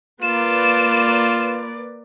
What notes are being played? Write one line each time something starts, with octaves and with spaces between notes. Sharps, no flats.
A#3 F4 B4 D5 E7